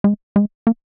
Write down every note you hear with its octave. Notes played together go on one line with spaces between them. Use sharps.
G#3
G#3
A#3